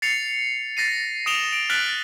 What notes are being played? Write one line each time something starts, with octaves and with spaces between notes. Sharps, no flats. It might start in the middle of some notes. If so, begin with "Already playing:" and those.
A6 C7 C#7 F7
A6 A#6 C7 D#7
D#6 D7 E7 F7 G7
D7
F6 F#6 A6 B6 D7 F#7